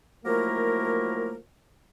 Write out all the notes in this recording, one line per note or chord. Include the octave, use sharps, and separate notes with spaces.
F3 F#3 A3 A#3 E4 A#4